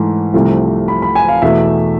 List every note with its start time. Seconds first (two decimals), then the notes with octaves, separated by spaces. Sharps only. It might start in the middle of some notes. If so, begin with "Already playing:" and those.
Already playing: G#2 E3 A3
0.34 C2 C3 F3 A3
0.88 B5
1.02 B5
1.15 G#5
1.28 F5
1.42 E2 B2 A3 E5